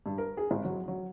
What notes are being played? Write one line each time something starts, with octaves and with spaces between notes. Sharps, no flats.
G2
A#4
G#4
G#1
F#3
F#3